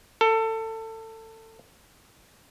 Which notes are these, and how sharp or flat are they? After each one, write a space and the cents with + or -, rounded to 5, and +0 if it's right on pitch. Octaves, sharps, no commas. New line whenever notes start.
A4 +25